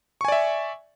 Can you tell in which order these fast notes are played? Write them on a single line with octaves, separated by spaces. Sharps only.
C#6 G#5 D5 E5